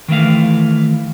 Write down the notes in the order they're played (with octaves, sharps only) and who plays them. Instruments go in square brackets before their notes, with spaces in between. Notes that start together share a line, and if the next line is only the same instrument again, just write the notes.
[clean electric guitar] D#3 E3 A3 F5